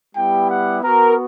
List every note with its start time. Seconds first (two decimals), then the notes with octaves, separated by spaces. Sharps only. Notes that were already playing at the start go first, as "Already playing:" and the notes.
0.14 G3 B3 E4 G4 G5
0.49 F#5
0.83 B3 F#4 A#4